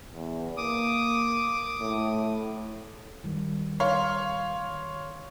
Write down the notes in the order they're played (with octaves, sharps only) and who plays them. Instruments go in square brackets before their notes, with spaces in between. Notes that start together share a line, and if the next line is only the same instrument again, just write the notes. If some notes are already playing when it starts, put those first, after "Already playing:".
[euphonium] E2
[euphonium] A#3 [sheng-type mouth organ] D6 D#6
[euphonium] A2
[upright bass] D#3 G3
[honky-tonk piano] C#5 F5 C6